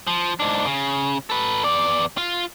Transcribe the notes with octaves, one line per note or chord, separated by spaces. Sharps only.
F3
G#2 D4
C#3
A4 B4
E2 D5
F4